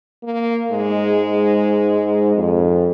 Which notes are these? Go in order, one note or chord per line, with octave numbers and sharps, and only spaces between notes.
A#3
G#2 G#3
F2